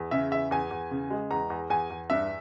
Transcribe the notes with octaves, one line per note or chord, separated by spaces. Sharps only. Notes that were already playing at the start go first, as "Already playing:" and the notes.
Already playing: E2
C#3 E5
E2 E5
E2 G#5
E2
C#3
G#3
E2 A#5
E2
E2 G#5
E2
G2 E5